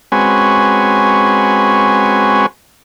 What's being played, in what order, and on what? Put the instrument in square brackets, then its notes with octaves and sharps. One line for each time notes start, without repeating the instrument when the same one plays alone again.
[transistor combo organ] G#3 C4 C#4 F#4 B4 G#5